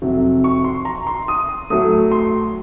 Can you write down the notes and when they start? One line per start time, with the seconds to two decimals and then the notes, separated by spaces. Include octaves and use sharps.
0.02 F2 C3 F#3
0.44 C#6
0.64 C6
0.85 A#5
1.07 C6
1.28 D#6
1.70 A2 F#3 A3 D#6
2.12 C6